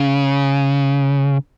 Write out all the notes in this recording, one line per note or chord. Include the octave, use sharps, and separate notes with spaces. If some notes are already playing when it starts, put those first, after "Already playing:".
Already playing: C#3